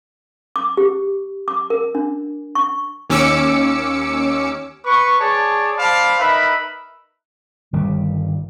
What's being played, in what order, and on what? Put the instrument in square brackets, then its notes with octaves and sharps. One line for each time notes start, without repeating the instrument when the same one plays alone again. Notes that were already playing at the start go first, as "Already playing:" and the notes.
[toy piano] D6
G4
D6
A#4
D4
C#6
[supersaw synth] D#2 C#4 D6 E6 C#7
[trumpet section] B4 C#6
G#4 C#5 D5 A5
C5 D5 F5 A5 B5
D#4 A#4 B4 E5 B5
[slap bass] G1 D#3 G3